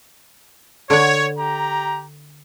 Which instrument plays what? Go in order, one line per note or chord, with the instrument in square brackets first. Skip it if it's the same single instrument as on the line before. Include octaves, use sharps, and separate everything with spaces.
[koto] D3 F#5 [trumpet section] C#5
[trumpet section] G4 A#5